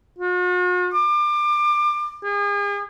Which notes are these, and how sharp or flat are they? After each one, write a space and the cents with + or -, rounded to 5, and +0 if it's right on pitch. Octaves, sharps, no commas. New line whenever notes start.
F#4 -45
D6 +30
G#4 -40